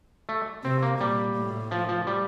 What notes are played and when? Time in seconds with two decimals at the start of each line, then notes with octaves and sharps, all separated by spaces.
0.29 A3
0.64 C3 C4
0.82 A#3
0.99 A#2 G3
1.35 A2
1.71 F3
1.89 F3
2.07 G3